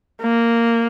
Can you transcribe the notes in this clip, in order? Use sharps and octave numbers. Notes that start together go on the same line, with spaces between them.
A#3